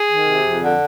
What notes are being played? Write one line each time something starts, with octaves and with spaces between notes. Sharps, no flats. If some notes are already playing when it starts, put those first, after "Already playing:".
Already playing: G#4
D#3
C3
F2
D3